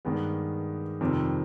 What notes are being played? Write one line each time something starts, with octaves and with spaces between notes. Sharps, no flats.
G2 D#3 G#3 B3
F2 C3 D#3 G3